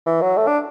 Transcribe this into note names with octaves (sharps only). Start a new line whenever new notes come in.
E3
F#3
A3
D4